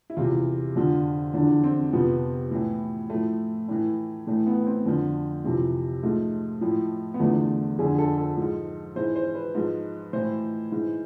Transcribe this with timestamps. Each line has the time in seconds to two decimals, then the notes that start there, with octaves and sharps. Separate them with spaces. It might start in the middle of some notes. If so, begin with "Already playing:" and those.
0.10 E4
0.17 E2 C3 E3 F4
0.76 F2 D3 F3
1.34 E2 D3 F3 D4
1.64 C4
1.93 F2 C3 F3 B3
2.51 A2 E3
3.10 A2 F3 A3
3.69 A2 E3
4.27 A2 E3 A3
4.47 B3
4.66 C4
4.86 F2 D3 F3
5.44 F2 C3 E3
6.03 G#2 F3 A3
6.61 A2 F3
7.14 B3
7.20 E2 D3 F3 A3
7.79 F2 D3 F3 G#4
7.98 A4
8.18 A4
8.37 G#2 F3
8.96 G#2 E3 C5
9.16 C5
9.35 B4
9.55 G#2 F3
10.13 A2 E3 C5
10.72 G#2 E3